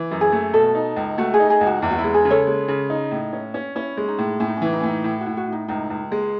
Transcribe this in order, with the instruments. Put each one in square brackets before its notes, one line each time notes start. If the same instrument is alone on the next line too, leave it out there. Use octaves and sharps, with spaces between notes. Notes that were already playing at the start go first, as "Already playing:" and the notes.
Already playing: [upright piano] E3
F#2
[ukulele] G#4
[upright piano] A3
[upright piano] B2 [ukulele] A4
[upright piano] D#4
C#2
[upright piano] A3 [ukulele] F#4
[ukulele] G#4
[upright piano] D#4
[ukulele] G#4
[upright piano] C#2
[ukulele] F#4
[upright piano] E2 [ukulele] E4
[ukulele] F#4
E4
[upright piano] G#3
[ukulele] G#4
[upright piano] C#3
[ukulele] A4 C#5
[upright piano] G#3
C#3
D#4
A2
C#4
C#4
[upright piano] C#4 [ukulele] E4
[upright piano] G#3
[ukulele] D#4
[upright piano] A2
[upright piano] A2 [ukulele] C#4
[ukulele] D#4
[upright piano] E3 [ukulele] C#4
[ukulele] D#4
C#4
[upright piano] A2
[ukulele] D#4
[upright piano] A2 [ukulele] E4
[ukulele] F#4
[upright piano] A2
[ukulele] F#4
[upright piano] A2
[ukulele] D#4
[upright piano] C#2 [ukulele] D#4
[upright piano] C#2
G#3